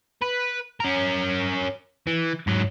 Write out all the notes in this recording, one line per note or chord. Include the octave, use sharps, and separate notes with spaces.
B4
C#4 A#4
E3
G#2 F#3